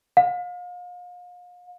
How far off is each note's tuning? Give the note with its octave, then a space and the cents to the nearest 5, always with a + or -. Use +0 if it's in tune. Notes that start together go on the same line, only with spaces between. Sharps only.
F5 +35